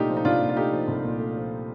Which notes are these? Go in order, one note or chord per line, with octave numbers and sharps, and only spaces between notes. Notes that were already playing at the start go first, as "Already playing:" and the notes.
Already playing: C2 A#2 A3 D4 D#4 F4 G4
F3
D#4
C2 D4 F4
A#2
F4
A3 D#4 G4
F3
C2
A#2
A3
F3